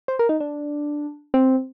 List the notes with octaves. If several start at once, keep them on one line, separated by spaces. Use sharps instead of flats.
C5
A#4
D#4
D4
C4